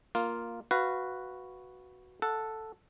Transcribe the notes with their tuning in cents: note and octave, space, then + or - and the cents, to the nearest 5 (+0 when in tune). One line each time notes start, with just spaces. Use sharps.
A#3 +0 F4 +0
F#4 +0 B4 +0 F5 -15
A4 +0 F#5 -15